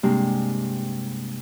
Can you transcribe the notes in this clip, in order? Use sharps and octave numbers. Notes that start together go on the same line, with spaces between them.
G2 C3 G#3 A#3 D4 G4